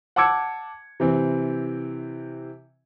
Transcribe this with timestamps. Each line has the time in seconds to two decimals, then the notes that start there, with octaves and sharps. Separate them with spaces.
0.16 F#5 A5 D6 E6 G#6 C#7
1.00 C3 E3 C4